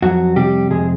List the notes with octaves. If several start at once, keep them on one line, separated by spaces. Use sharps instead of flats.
F2 F#3 F#4
C3 G3 G4
F2 G#3 G#4